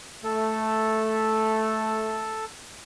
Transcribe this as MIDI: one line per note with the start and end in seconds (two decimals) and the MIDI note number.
0.24 2.39 57
0.24 2.45 69